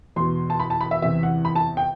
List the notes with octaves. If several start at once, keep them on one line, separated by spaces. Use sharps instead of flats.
E2 B2 C6
A5
B5
A5
B5
E5
E2 C3 E3 E5
F#5
B5
A5
G5